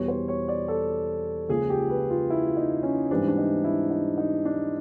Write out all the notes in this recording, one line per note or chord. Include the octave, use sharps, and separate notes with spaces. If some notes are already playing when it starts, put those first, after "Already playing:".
Already playing: E2 B2 G3 B3 C#5
C5
C#5
D5
A4
C#2 C#3 F3 A#3 G#4
G4
B4
F4
E4
D#4
C#4
G#2 E3 G3 C4 D4
D4
D#4
E4
D#4
D#4
D4